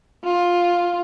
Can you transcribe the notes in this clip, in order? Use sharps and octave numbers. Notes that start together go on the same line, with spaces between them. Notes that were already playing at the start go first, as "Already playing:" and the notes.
F4